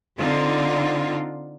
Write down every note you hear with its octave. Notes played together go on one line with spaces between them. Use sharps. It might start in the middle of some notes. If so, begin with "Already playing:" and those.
D3 C4 D#4 F4